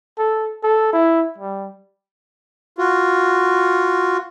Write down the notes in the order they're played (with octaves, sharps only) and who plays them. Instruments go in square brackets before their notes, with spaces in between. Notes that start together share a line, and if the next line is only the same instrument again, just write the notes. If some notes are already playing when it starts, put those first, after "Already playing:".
[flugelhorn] A4
A4
E4
G3
[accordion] F4 F#4